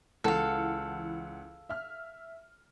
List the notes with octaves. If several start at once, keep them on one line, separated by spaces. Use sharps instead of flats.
C#2 E3 A4 F5 F#5
E5 F6